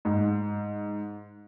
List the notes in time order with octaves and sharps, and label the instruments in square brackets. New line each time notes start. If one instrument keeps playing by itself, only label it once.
[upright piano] G#2